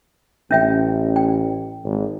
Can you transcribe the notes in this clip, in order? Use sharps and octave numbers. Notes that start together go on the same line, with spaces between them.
A1 C#4 E5 G5
G5
G#1